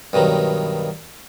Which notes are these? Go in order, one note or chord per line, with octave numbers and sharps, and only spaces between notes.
G2 B2 D#3 F#3